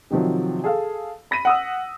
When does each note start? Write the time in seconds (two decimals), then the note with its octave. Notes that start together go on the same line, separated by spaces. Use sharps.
0.10 C3 D#3 F3 F#3
0.64 G#4 A4 F5
1.31 B5 A#6 B6 D#7
1.45 F#5 D#6 E6